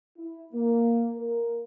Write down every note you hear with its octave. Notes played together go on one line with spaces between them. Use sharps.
E4
A#3
A#4